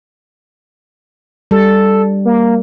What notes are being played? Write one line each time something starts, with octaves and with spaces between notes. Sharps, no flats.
G3 A4
A#3